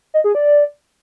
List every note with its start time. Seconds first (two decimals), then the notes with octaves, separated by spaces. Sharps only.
0.14 D#5
0.24 G#4
0.35 D5